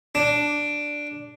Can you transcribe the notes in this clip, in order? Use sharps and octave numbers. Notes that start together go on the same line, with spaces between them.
D4